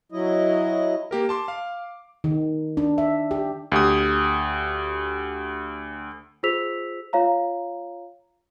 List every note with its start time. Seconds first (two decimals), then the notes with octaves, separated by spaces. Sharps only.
0.12 F#3 E4 D#5
1.11 A#3 G4 A#4
1.29 A5 C6 D6
1.48 F5
2.24 D#3
2.77 D4
2.98 E5
3.31 G4
3.72 D2 G4 D#6
6.43 F4 G#4 C5 E6 B6 F7
7.13 F4 C#5 F5 A#5